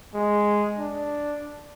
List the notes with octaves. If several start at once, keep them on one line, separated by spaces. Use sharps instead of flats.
G#3
D4